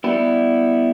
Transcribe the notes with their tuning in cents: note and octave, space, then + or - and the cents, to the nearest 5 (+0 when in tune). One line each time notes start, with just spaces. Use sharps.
G3 +0 B3 +0 E4 +0